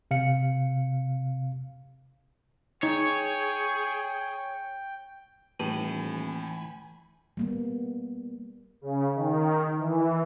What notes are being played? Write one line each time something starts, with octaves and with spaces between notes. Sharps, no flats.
C3 F5 C#7
D#4 G#4 C#5 G5
D#1 A2 E3 G#5 B5
G3 A#3 B3
C#3
D#3
E3